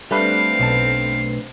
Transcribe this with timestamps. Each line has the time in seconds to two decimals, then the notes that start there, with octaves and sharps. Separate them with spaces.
0.11 G3 A3 C4 D4 B4 F5
0.59 B1 A5